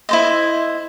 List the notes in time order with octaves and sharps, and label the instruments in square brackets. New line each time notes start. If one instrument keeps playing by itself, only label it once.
[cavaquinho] E4 C5 D#5